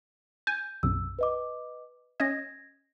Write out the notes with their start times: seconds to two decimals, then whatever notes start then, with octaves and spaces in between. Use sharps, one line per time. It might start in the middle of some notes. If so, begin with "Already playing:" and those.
0.47 G#5 G6
0.83 B1 F#2 C3 E6
1.19 B4 D#5 D6
2.20 C#4 D#5 G#6 A#6